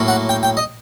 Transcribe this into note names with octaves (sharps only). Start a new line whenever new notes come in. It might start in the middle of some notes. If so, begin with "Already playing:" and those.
Already playing: A2 F#3 A#3
F#5
G5
G5
D#5